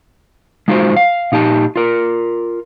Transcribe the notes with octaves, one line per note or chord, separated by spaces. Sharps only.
G#3 D#4 F4 F#4 G#4 C5
F5
A#2 D#4 G4 A5
F4 A#4